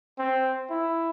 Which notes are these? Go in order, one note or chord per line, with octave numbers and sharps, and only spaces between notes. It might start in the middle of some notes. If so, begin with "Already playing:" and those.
C4
E4